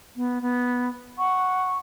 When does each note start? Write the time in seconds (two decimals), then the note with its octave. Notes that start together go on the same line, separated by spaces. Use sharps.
0.16 B3
0.42 B3
1.18 F#5 C#6